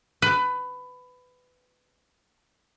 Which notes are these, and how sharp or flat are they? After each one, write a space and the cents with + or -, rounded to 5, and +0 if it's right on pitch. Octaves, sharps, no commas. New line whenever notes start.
B4 +20